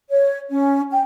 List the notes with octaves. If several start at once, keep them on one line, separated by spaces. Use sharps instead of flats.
C#5
C#4
G5